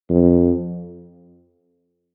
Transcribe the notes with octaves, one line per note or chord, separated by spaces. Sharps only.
F2